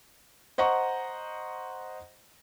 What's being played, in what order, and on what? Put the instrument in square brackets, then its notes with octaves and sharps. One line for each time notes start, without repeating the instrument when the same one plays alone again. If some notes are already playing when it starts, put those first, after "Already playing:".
[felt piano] C5 D#5 F#5 A#5 C#6